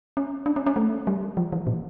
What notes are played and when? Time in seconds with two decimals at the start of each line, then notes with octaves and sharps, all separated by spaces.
0.17 C#4
0.46 D4
0.56 C#4
0.66 C#4
0.76 A3
1.07 G3
1.37 F3
1.52 E3
1.67 A#2